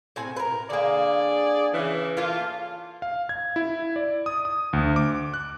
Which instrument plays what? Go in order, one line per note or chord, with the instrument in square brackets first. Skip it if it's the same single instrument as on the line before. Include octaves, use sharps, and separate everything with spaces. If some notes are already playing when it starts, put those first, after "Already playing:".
[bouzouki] A2 C4 G#5
A#4 B4
[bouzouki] D3 A#3 [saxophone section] G#4 D5
[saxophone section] C#3 E3
[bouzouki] A3 A#3 [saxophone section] F4
[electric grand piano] F5
G#6
E4
D5
D#6
D#6
D2
D6
F#6